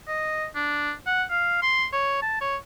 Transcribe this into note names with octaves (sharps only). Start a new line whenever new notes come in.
D#5
D4
F#5
F5
C6
C#5
A5
C#5